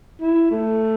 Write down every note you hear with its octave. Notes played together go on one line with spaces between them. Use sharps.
E4
A3